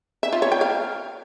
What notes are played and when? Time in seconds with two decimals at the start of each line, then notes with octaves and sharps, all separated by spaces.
0.23 E5
0.32 F4
0.42 C#5
0.52 G5
0.61 F5